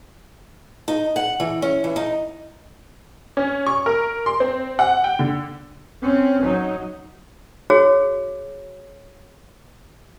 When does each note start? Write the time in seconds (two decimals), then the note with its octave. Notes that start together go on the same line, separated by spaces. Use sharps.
0.88 D#4
1.16 F#5
1.40 E3
1.62 C#4
1.84 E3
1.96 D#4
3.37 C#4
3.66 C#6
3.86 A#4
4.26 C6
4.40 C4
4.79 F#5
5.04 G5
5.19 D3
6.02 C4 C#4
6.43 F#3 D#4
7.70 F#4 G#4 C#5